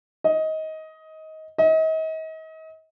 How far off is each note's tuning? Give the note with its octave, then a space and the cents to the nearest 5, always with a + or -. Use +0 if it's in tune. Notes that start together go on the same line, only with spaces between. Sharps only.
D#5 +20
D#5 +40